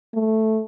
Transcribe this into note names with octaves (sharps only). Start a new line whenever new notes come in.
A3